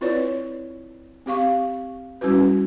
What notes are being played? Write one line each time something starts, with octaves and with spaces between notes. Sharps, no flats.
C4 E4 F4 B4 C#5 D5
C4 G4 F5 C#6
G3 C#4 E4 F#4 B4